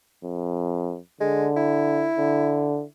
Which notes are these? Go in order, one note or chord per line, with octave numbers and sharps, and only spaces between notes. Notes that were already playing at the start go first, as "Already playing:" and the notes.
F2
D3 G#3
E4
D3